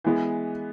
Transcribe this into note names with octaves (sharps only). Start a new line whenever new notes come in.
E3 G#3 B3